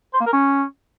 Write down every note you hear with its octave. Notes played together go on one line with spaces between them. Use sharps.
C5
A#3
A#4
C#4